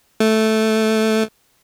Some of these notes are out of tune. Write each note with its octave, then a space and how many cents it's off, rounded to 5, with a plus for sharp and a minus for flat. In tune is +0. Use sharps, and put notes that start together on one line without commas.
A3 -5